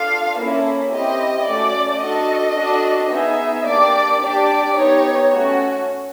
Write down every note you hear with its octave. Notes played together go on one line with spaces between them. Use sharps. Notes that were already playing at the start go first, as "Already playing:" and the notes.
Already playing: D4 F4 A4 F5
A#3 C#4 E4 A4
C4 E4 G4 D#5
A3 C#4 F#4 D5
D4 F#4 A4 D#5
D4 F#4 A4
B3 D#4 G#4 E5
A#3 D4 G4 D5
D4 G4 D5
B3 D#4 G4 C#5
A3 C#4 F#4